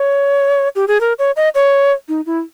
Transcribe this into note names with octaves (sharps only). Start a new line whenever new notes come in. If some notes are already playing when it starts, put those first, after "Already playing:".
Already playing: C#5
G4
G#4
A#4
C#5
D#5
C#5
D#4
E4